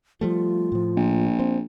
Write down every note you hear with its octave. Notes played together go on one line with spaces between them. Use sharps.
F3 G3 A3 F4
A2 F3
A#1
C4